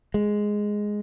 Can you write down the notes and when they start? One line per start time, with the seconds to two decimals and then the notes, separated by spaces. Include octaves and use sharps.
0.14 G#3